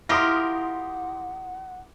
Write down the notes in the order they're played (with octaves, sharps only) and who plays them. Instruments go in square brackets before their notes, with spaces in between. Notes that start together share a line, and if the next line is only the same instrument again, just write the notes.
[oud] E4 [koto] F4 G4 A#4 [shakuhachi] F#5 [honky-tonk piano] C6 D#6 A#6